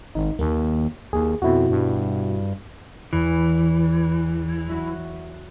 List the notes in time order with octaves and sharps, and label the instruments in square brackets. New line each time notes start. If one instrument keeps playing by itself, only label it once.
[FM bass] G#1 [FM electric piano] D#4
[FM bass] D#2 [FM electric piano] A#3
[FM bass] D#2 [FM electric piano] G#4
[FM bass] F2 [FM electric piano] B2 E4 F#4
[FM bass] G2
[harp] E2 [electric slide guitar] E3
[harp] F#3 E4 F#4